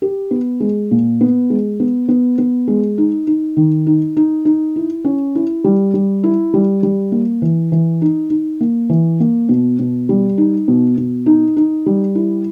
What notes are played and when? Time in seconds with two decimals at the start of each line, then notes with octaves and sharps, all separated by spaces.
0.02 G4
0.31 B3
0.60 G#3
0.91 A#2
1.21 B3
1.50 G#3
1.80 B3
2.09 B3
2.38 B3
2.68 G#3
2.98 D#4
3.27 D#4
3.57 D#3
3.87 D#4
4.17 D#4
4.45 D#4
4.76 E4
5.05 C#4
5.35 E4
5.64 G3
5.94 G3
6.23 E4
6.54 G3
6.83 G3
7.12 A#3
7.42 E3
7.72 E3
8.02 D#4
8.30 D#4
8.61 A#3
8.90 E3
9.20 A#3
9.49 B2
9.79 B2
10.09 G3
10.38 D#4
10.68 B2
10.98 B2
11.26 D#4
11.57 D#4
11.86 G3
12.15 E4